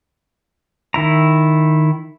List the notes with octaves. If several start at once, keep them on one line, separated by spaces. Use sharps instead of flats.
D#3 E4 A#5